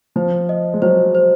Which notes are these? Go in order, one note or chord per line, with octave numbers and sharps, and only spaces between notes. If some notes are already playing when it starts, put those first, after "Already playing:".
F3 C5
D#5
G#3
F#3 C5
C5